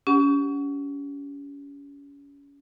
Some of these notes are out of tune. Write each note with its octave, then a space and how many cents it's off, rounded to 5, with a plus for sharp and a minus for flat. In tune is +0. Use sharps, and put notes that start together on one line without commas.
C#4 +30 G4 +0 F#5 +0